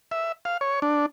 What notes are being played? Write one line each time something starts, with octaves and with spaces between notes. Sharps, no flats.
E5
F5
C#5
D4